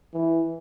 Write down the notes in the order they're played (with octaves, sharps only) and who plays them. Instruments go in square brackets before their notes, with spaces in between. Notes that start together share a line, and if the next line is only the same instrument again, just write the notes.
[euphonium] E3